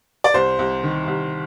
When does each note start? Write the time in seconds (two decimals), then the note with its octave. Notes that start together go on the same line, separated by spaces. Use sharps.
0.24 D5
0.34 C2 C5
0.59 C2
0.83 D#3
1.07 C2